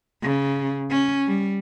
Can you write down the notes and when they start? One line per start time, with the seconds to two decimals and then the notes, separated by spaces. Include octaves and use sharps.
0.23 C#3
0.91 C#4
1.27 G3